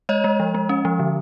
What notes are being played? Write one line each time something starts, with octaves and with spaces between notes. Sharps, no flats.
G#3 C#5 D#5
G#3
F3
G#3
C#4
F3
D3